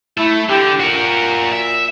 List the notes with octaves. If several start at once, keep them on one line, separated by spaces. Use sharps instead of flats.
A3 E4 A4
D3 G4
A#2 F#4 A#4
E5